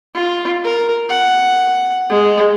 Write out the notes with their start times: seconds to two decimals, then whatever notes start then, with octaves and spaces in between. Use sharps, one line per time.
0.15 F4
0.64 A#4
1.10 F#5
2.10 G#3